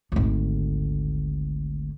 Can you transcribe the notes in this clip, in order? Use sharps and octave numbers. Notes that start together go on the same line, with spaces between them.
G#1 D2